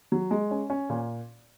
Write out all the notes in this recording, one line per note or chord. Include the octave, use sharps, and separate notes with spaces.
F#3
G#3
C#4
C#4
A#2